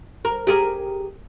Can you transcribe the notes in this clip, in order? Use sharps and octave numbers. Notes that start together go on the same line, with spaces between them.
A#4
G4 G#4 A#4